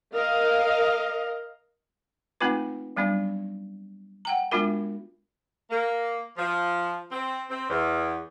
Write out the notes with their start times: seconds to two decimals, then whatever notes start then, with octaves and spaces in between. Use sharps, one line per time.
0.14 A#4 D#5 F5
2.41 A3 A#3 C4 D#4 F4 B4
2.96 F#3 G3 B3 D4
4.25 F#5 G5 A#5
4.51 G#3 B3 D4 F4 F#4 A#4
5.71 A#3
6.37 F3
7.11 C4
7.50 C4
7.69 E2